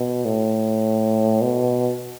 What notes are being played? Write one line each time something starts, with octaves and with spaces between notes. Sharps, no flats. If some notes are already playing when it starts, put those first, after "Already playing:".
Already playing: B2
A2
B2